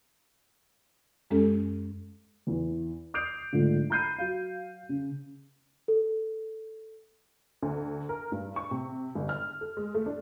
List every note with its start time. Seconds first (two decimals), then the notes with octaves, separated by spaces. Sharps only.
1.31 F#2 G#3 C#4 G4 A4
2.47 E2 E3
3.14 D6 D#6 G6 C7 D7 F7
3.52 G#2 D3 F3 A3
3.90 A#5 B5 G6 C7 D#7
4.18 F#3 F5
4.89 C#3
5.88 A4
7.62 D2
8.09 A#4
8.32 G2
8.56 C#6
8.71 C3
9.15 G1
9.29 F6
9.61 A4
9.77 G#3
9.94 A3
10.06 D4